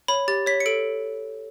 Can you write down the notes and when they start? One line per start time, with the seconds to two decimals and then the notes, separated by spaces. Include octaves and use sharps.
0.08 C#5 B5
0.28 G4 A6
0.46 C#5 B6
0.60 C#7
0.66 A4 D7